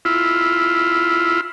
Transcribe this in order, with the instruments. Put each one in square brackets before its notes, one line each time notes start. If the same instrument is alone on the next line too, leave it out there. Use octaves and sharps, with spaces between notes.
[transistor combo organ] E4 F4